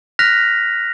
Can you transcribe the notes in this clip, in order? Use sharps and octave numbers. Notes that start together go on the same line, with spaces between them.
F6 F#6 A#6 B6 F7